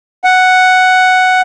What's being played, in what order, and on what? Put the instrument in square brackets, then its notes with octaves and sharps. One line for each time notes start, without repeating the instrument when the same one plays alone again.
[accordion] F#5